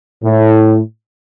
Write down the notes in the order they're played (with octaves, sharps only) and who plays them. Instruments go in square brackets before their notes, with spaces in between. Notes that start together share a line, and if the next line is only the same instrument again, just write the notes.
[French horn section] A2